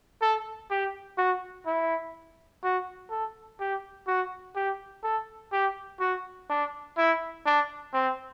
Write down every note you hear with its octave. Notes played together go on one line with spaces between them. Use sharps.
A4
G4
F#4
E4
F#4
A4
G4
F#4
G4
A4
G4
F#4
D4
E4
D4
C4